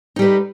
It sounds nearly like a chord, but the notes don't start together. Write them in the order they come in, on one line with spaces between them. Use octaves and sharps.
D#4 G3 B4